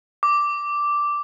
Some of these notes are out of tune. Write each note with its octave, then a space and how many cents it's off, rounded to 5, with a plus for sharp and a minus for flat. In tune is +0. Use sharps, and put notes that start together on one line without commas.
D6 -5